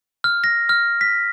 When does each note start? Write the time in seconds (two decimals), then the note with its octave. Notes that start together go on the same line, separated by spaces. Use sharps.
0.24 F6
0.44 A#6
0.69 F6
1.01 B6